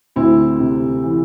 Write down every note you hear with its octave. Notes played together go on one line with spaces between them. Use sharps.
D2 C4 E4
C3
E3